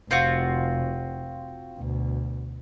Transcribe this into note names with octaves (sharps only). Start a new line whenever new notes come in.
F1 C4 F4 F#4
D2 B2